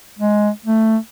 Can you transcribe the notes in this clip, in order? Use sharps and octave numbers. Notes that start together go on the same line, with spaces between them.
G#3
A3